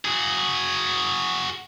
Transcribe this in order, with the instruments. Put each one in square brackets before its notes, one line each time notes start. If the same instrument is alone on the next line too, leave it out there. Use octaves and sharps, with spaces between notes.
[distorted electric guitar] F#4 G#4